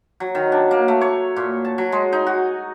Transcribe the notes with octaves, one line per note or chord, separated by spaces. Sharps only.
F#3
D#3
D4
A#3
A3
C#5
A#2
A5
F#3
G#3
D#4
F#4